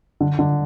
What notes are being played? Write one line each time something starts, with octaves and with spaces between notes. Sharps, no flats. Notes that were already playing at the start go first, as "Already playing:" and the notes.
D3
D3